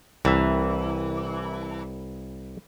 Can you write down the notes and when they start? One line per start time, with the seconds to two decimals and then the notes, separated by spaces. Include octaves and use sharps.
0.25 C2 E3 E5